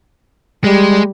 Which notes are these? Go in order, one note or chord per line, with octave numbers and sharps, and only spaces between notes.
G3 G#3